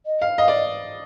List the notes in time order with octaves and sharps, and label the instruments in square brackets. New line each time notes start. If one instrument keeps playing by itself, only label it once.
[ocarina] D#5
[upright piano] F5
[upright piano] D#5 [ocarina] F5
[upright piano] D5
[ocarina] D#5